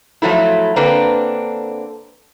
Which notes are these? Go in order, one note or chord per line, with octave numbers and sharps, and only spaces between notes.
F3 F#3 A3 E4
D3 A#3 C4 D4 A4 B4